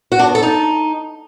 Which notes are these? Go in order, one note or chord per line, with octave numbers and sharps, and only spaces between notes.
F#4
D4
B3
A4
D#4